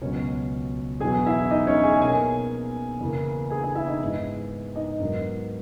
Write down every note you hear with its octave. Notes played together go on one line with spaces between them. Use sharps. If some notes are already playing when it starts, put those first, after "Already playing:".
C#2 B2 F#3 C#4 C#5
E2 B2 F#3 G#4 G#5
E4 E5
D#4 D#5
C#4 C#5
G#4 G#5
B2 A#3 G#4 G#5
E2 C#3 E3 A#3
G#4 G#5
G#4 G#5
E4 E5
D#4 D#5
G#2 E3 B3
D#4 D#5
G#2 F#3 B3 A#4